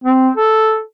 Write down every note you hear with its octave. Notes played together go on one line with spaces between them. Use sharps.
C4
A4